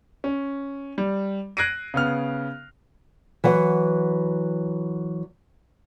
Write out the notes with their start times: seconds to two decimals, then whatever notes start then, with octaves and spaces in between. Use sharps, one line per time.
0.24 C#4
0.98 G3
1.57 F#6 G#6 A#6 C7 D7 D#7
1.94 C#3 B3 F6
3.44 E3 F#3 F#5